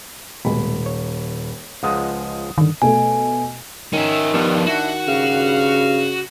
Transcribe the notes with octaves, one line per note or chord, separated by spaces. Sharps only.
D#1 B2 G#3 B5
C#5
C#2 F3 G#3 F#5 D#6
G2 D3 D#3
B2 A3 G#5
D#3 C#4 E5
G2 F3 B3
D4 E4 F#4
G2 C#3 F5